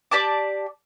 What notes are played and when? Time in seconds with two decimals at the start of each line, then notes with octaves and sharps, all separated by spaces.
0.11 G4 D5 A5 D6